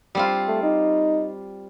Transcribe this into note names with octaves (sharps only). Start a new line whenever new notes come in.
G3 C4 F4
A3
D#4